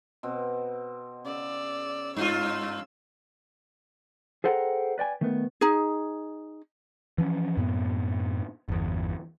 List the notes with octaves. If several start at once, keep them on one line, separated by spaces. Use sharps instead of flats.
B2 C4
C#3 D5 E6
G2 F4 C#5 E6
G#4 A4 C5 F#5 G5 A#5
B4 D5 G5 G#5
D#3 A3 B3
D#4 G#4
E3 F3 C#4
F#2 A2 B3
G1 E2